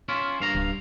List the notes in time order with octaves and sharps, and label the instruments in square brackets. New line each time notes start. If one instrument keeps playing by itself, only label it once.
[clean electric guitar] C#4 E4 F4
G2 F5 A#5
[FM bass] D1